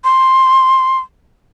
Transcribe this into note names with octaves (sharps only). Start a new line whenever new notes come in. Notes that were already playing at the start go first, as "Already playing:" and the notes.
C6